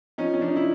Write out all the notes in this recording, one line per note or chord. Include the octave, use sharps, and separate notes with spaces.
F3 C#4 D#4
C#4
F3 D4
D#4
E4